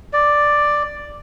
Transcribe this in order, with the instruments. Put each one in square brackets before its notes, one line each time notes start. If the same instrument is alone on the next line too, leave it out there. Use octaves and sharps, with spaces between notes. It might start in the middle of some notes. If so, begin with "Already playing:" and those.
[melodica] D5